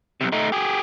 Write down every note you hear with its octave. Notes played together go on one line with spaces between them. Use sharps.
B1 C3
A3 D#4
G4 G#4